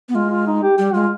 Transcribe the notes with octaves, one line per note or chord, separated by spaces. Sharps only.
B3
G#3 F4
F4
D#4
G4
G3 G4
G#3 F4